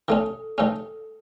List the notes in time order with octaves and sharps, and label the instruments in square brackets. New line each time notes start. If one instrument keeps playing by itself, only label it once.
[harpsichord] D#3 A3 C#4 [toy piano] A4
[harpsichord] D#3 A3 C#4 [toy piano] A4